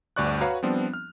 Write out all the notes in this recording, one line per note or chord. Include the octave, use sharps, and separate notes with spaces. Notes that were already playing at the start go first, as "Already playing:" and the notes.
G1 D2 G2 D5 C#6 F#6
F#4 B4 C#5 F5 A#5
F3 G3 B3 C4 D4 F4
F6